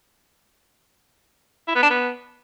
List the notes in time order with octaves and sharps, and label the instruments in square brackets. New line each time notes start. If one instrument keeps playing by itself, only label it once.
[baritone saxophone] E4
B3
D4
B3